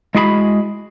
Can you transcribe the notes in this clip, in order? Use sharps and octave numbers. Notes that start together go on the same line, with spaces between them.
G#3 E4 F#4 G#4 G#5 B5